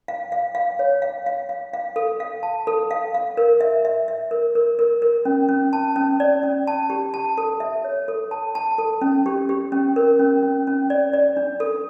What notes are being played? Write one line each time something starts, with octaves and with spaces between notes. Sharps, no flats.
F5
F5
F5
C#5
F5
F5
F5
F5
A4
F5
A5
A4
F5
F5
A#4
E5
E5
E5
A#4
A#4
A#4
A#4
C#4
C#4
A5
C#4
D5
C#4
A5
G4
A5
A4
E5
C#5
A4
A5
A5
A4
C#4
G4
G4
C#4
A#4
C#4
C#4
C#4
D5
D5
D4
A4